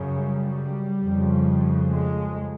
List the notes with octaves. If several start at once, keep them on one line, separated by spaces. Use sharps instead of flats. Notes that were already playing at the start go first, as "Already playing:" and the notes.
Already playing: F#2 C#3
G3
F2
C#3
G#3